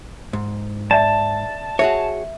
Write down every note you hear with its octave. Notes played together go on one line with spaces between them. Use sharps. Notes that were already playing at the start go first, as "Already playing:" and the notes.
G#2
D5 E5 A5
F#4 G#4 C#5 E5